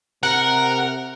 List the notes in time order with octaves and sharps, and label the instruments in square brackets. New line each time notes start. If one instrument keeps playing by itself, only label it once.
[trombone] C3 [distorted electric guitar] A#4 [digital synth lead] F#5